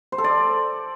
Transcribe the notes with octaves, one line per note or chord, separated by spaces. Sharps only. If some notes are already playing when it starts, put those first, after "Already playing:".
C5
A4
D5